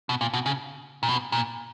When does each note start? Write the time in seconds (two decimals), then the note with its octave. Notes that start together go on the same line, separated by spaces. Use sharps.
0.09 B2
0.21 A#2
0.33 B2
0.46 C#3
1.03 A#2
1.08 B2
1.32 A#2